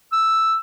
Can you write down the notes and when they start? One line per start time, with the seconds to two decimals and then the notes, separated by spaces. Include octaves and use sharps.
0.13 E6